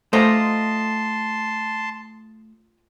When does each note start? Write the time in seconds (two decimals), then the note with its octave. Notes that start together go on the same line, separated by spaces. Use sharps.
0.13 A3 F4 C5 D#5 A5 A#5 C6